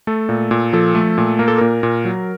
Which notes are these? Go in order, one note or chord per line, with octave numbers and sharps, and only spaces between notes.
A3 A4
A#2
A#2
F3 A4
A3
A#2
A#3 A#4
A4
A#2 A#4
A#2
F#3